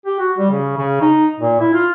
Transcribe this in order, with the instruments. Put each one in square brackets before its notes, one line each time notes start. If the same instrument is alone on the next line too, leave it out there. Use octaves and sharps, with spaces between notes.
[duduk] G4
F#4
G3
C#3
C#3
D#4
A#2
E4
F4